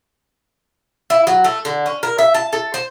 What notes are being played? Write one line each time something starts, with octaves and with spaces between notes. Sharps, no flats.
E4
F#3
A3
D3
C#4
A#4
E5
A5
A4
C5